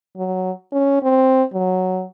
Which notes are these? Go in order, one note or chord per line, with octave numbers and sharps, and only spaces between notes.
F#3
C#4
C4
F#3